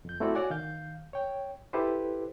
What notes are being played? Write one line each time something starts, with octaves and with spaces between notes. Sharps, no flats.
F2 G6
A3 C4 E4 F#4 A4 D5
F#4 C#5 D5 F#5 G#5
D#3 F5 G6
C#5 G5
E4 G4 A4 B4 C5